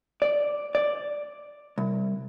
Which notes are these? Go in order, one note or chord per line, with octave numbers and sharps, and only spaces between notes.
D5
D5
C2